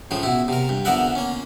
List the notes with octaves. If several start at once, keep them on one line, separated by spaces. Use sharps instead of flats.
C#2 A2 C#3 F3
B2 E4
C3 A#4
G2
F2 D3 B3 A#4 E5 F#5
A#3 C#4